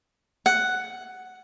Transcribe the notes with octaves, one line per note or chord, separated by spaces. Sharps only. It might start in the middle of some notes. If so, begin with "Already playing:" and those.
F#5